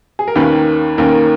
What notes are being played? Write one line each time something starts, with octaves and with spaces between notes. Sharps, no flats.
G#4
A#4
D#2 D#3 A#3 C#4 B4
D#2 D#3 A#3 C#4 A#4